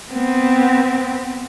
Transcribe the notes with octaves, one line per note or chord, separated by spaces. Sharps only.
B3 C4